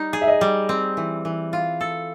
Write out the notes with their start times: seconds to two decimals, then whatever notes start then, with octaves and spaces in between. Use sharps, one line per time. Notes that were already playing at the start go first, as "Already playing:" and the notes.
Already playing: G3 D#4
0.13 G#4
0.21 E5
0.27 D#5
0.41 G3
0.69 C4
0.97 E3
1.25 E3
1.53 F4
1.81 A4